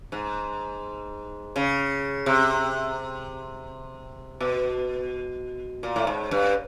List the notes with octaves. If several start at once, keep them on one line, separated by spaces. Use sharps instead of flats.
G#2
C#3
C3
B2
A#2
A2
G#2
G2